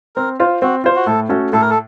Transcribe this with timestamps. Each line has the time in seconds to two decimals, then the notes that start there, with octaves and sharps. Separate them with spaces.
0.16 C4 A#4
0.39 F4 C5 F5
0.62 C4 F#4
0.84 F4 C5 F5
0.96 F#4
1.07 A2 A4
1.29 A3 C#4 F#4 A4
1.53 A2 A4
1.61 A#4
1.70 A4